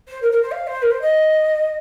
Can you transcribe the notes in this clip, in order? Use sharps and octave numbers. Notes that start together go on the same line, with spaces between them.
C5
A#4
A#4
C5
F5
C5
A#4
C5
D#5